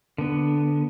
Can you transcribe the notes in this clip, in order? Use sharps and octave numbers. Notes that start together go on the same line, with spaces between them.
D3 B3